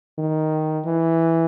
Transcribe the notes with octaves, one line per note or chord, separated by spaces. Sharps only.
D#3
E3